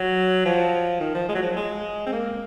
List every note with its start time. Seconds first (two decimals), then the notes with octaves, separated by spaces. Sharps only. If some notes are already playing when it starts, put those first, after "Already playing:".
Already playing: F#3
0.45 F3
1.00 D#3
1.15 F3
1.29 G#3
1.35 F#3
1.42 F3
1.56 G#3
2.06 C4
2.12 A#3